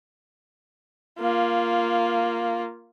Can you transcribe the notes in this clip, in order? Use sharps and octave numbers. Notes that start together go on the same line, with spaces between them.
A#3 F4